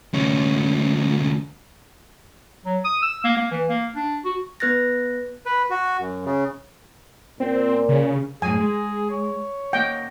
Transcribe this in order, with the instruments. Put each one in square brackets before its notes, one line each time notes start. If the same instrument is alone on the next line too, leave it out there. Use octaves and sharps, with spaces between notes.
[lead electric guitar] D2 C#4
[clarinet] F#3
D#6
E6
A#3
A#3
E3
A#3
D4
F#4
[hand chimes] B3 B4 F#6 A6 A#6
[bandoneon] B4
F#4
F#2
C#3
[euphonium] A#2 [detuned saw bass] C4
[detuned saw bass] C#3
[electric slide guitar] F#2 A2 [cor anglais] G#4 [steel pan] G#5
[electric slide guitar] G#3
[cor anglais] C#5
[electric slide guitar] A#3 D#5 F#5 [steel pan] G5